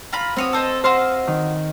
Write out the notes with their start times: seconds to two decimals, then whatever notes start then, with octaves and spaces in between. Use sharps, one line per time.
0.13 F4 A#5 B5
0.36 C4 F#4 C#5 D#6
0.53 A4 C5 D#5
0.84 F#4 C5 D#5 F5 C6 E6
1.27 D#3